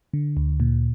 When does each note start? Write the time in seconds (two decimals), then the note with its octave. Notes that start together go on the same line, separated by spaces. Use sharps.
0.13 D3
0.37 D2
0.60 A#2